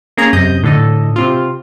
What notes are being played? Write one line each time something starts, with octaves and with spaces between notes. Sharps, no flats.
A#3 C#4 G#4 A#5
F#2 C3 D#5 D#6 G6
A2 D3 A4 D#5
C3 C4 F4